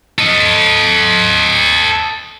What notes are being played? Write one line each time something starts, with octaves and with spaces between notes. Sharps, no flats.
A4 D#5